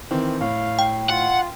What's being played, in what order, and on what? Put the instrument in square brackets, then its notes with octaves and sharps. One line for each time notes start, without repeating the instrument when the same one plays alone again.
[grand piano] D#3 E3 C4
[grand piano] A2 [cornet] F5
[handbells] G5
[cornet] F4 [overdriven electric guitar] F#5